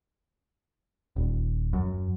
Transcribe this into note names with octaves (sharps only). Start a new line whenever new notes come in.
D#1
F#2